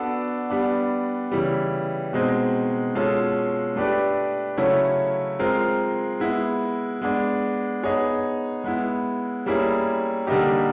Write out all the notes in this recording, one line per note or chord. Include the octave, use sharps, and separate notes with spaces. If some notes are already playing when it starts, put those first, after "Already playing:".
Already playing: B3 D4 F#4 A4 D5
G3 B3 D4
C#3 E3 G3
B2 G#3 C4 D#4
B2 G#3 C#4 F4 A4
A3 D4 G4 B4 D5
C#3 F#3 A3 C#4 E4
G#3 C4 F4 A#4
G#3 B3 E4
G#3 B3 D4
B3 D#4 G#4 C#5
G#3 B3 E4
G3 A#3 C#4 E4 G#4
D3 G3 A#3 D#4 G4